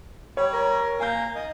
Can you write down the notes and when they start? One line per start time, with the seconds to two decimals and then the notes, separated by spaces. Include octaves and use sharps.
0.37 G3 C#5
0.53 A#4
1.00 A#3 G#5 G6
1.35 D#3 D#5